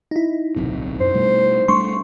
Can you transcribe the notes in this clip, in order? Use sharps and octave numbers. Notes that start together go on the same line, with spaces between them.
D#4 E4
D1 B1 C3
F#2 C5
B2 G3 A3
G3 A3 D4 C6 C#6